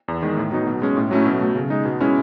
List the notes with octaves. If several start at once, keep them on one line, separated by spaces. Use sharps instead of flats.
E2
D#3 G#3
A2
F#3 B3 D#4
B2
G#3 C#4
A2
F#3 A3 C#4 E4
B2
F#3 A3
C#3
G#3 D#4
B2
G#3 C#4 E4